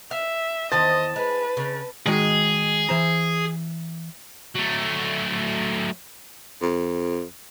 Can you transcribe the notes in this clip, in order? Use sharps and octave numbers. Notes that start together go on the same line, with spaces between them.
E5 F5
E2 D#3 C5 D#5 A5
G#3 B4
C#3
D#3 G#3 F#4 G#4
E3 C5 A#5
F#3 A3
F2